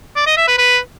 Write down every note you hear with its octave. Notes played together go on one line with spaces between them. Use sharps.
D5
D#5
E5
B4
B4